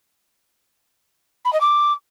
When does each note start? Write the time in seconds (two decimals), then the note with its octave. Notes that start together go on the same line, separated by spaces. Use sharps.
1.45 B5
1.53 D#5
1.61 D6